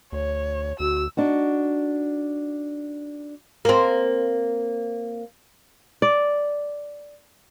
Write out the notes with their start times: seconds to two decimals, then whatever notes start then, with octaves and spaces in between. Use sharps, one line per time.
0.12 D2 C#5
0.80 D2 F#4 E6
1.17 D4 D#4 F#4
3.65 A#3 C4
6.02 D5